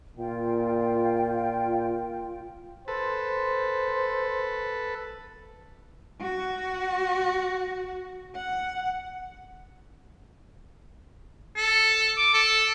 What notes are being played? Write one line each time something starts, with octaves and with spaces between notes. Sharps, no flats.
A#2 F4 G5
A4 B4 C5
F#4
F#5
A4
D6
A4